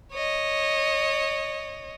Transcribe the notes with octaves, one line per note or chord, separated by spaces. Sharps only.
C#5 D#5